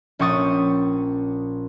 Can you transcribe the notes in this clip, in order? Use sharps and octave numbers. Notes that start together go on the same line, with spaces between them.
A#1 C#4 G5 C#6 D#6 A6